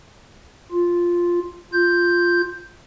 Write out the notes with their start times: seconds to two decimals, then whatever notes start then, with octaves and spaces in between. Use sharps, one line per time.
0.71 F4
1.73 F4 G6